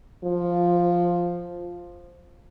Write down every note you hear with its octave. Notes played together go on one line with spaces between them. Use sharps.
F3